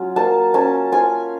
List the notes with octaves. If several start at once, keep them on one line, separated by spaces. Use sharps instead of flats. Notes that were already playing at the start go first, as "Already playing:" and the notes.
Already playing: F#3 C#4 F4
A#3 A5
C#4 A5
F4 G#5